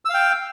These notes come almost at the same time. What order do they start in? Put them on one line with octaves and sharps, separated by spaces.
E6 F5 G5